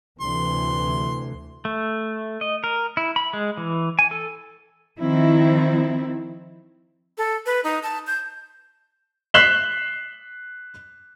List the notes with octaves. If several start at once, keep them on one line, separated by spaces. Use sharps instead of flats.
D2 C3 E3 C6
A3
D#5
A#4
E4
B5
G#3
E3
G#5
A4
D#3 F3 C4 E4
A4
B4
D#4
A5
G6
F#6 B6 C7 E7 F#7 G7